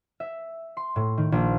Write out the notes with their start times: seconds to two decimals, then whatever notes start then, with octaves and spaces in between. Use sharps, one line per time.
0.20 E5
0.77 C6
0.96 A2
1.18 D#3
1.32 A#1